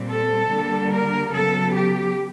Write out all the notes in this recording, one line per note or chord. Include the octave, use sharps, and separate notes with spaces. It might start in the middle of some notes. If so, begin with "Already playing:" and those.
Already playing: A#2 G3 C4
A4
D3 G3 A#3
A#4
C#3 F#3 B3 A4
G4